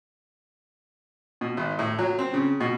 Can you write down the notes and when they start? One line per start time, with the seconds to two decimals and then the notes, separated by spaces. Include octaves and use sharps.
1.41 B2
1.57 G#1
1.79 A2
1.99 F#3
2.19 C4
2.34 C#3
2.60 B2